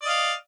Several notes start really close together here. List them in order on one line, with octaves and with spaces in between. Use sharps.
D5 D#5 F5